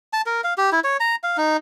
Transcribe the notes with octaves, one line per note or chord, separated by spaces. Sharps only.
A5
A#4
F5
G4
E4
C#5
A#5
F5
D#4